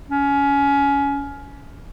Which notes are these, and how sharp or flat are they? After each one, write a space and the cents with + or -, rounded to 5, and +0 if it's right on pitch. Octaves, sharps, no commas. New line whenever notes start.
C#4 +20